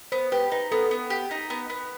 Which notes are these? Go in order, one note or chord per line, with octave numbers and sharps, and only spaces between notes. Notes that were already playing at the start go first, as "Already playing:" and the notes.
B3 C5
G4 B4
D#4 B4
B3 A4
B3
G4
D#4
B3
B3